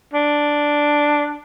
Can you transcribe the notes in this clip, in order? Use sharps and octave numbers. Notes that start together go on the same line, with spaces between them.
D4